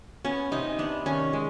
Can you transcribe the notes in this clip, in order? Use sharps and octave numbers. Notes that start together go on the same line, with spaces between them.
B3 C#4
C3 D#4
B3 D4
D#3 C#4
G#3